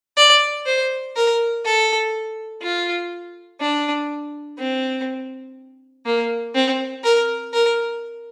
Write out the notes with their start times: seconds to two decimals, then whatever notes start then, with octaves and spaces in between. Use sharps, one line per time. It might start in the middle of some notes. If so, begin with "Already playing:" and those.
0.17 D5
0.66 C5
1.16 A#4
1.65 A4
2.62 F4
3.61 D4
4.58 C4
6.06 A#3
6.55 C4
7.04 A#4
7.53 A#4